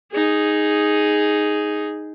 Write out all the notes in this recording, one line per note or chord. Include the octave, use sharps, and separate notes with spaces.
D#4 G#4